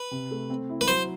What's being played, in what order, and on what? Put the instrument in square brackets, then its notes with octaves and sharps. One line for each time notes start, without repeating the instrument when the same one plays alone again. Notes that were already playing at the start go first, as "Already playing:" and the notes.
Already playing: [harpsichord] B4
[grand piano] C3
A3
C4
E4
[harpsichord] B4
[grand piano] F#3 [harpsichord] C5